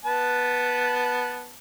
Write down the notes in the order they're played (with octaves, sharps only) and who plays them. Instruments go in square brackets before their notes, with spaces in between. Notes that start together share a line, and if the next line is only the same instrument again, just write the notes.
[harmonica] B3 B4 A5